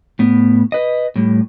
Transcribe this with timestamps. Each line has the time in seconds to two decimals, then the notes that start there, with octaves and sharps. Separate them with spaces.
0.19 A2 B3
0.72 B4 D#5
1.16 A2 G3